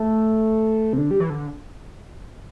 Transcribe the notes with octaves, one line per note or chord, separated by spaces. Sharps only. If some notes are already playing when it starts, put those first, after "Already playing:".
Already playing: A3
C3
D3
G3
E3
D3